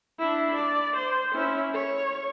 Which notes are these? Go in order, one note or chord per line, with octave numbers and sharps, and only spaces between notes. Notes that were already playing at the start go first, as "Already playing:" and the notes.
D4 E4
D5
C5
C#4 E4
C#5